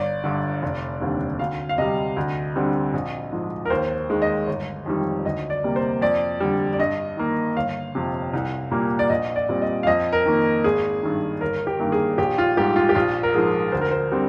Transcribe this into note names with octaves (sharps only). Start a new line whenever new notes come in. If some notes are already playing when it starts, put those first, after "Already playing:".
Already playing: G1 D5
G2 D3
F1
D#2 D3 G3 C4
D2 F5
F5
C3 G3 D#5
D2
D3 G3 C4
A#1
G#2 F3
A#4
D#2 C5
D#3 G#3
D#5
G1
F2 D#3 G3
D2 D#5
D5
C3 G3 A#3
C5
F2 D5
D3 G3
D5
G2 D#5
D#3 A#3
G1 F5
F2 C3
C2
A#2 G3 A#3
D5
A#1 D#5
D5
A#2 G3 C4
D#5
F5
F2 D#5
A#4
D#3 A#3
G#1 G#4
G2 D#3
G1 A#4
G4
G2 D#3 A#3
G#4
A#1 G4
F4
G#2 G3 G4
F4
G4
A#1 F4
A#4
G#2 F3 G#4
D2 C5
A#4
C5
D3 G3 C4